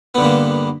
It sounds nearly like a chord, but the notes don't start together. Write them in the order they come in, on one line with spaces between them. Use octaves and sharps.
B3 D3 G2 A#3